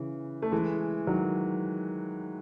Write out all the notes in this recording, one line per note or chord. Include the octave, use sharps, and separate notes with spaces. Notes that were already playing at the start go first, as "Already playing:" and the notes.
Already playing: C#3 E3
A3
E3 G#3
D#3 F#3